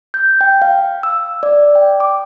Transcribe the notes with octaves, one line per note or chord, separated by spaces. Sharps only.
G6
G5
F5
E6
D5
G5
D6